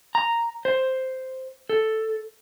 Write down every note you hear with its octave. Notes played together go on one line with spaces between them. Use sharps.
A#5
C5
A4